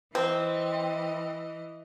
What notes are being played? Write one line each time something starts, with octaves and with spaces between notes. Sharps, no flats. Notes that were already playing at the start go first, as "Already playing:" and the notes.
E3 C4 D#5